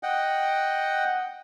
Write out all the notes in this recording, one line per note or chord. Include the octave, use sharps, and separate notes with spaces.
D#5 F#5 G5